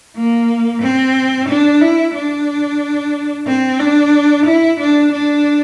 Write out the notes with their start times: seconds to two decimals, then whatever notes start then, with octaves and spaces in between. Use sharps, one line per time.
0.16 A#3
0.82 C4
1.48 D4
1.81 E4
2.14 D4
3.47 C4
3.80 D4
4.45 E4
4.79 D4
5.12 D4